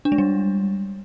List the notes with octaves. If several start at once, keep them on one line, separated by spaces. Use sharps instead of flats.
D4
G#3
G3